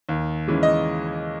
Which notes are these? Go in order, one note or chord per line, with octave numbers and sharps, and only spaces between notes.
D#2
C#3 E3 G#3
D#5